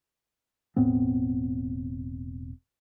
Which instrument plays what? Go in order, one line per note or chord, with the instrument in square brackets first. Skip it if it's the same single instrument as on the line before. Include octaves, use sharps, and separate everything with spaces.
[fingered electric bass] E1 A2 B3 C4